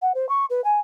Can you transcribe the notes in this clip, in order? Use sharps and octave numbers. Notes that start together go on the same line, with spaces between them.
F#5
C5
C#6
B4
G#5